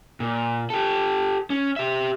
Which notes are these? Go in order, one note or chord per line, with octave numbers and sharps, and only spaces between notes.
A#2
G4 A4
C#4
G4 E5